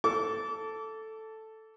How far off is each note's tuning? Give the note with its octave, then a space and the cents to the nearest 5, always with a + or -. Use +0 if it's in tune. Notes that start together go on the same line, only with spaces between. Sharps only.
A4 +0 D6 -30